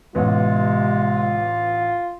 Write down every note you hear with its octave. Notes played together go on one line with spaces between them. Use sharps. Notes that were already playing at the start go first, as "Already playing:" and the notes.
A1 C3 G#3 B3 F4